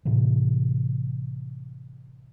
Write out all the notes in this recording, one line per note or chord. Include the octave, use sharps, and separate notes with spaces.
A2 C3 E3